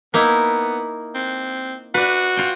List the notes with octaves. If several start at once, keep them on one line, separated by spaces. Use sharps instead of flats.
A#3 B3 D#4 E4
C4
F#4 B4 D5
F4 G5